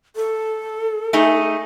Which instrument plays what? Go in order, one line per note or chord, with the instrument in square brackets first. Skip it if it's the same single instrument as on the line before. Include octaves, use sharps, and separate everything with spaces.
[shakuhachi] A4
[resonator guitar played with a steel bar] A3 D#4 G#4